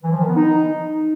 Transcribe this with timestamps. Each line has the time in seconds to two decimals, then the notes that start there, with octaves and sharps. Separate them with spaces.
0.03 E3
0.11 F3
0.19 D#3
0.27 B3
0.35 D#4